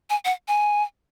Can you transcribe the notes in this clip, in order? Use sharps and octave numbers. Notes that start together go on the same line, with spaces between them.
G#5
F#5
G#5